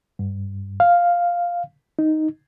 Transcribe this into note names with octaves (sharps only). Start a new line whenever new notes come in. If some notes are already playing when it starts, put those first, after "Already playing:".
G2
F5
D#4